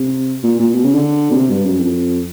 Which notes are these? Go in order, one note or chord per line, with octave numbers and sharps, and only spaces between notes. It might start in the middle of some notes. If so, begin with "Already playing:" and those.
Already playing: C3
A#2
A#2
B2
C#3
D3
B2
C3
G2
F#2
F2